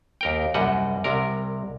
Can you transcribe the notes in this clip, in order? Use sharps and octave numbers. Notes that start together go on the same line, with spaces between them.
D#2 A#4 G5
C2 F#2 G3 D#5 F#5
C2 C3 A#4